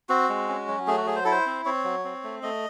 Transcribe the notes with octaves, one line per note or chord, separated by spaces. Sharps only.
C4 F#4
G#3
C#4
F#3
A3 G#4
F#4
F#3 G#4
C5
E4 A4
C5
C4
C4 C#5
F#3
C4
A3
A3 D#5